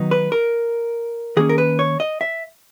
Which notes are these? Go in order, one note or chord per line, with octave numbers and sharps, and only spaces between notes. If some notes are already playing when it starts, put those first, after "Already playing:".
Already playing: D#3 F#3 B3 D#4
B4
A#4
D#3 A#3 C#4 G#4
A#4
B4
C#5
D#5
E5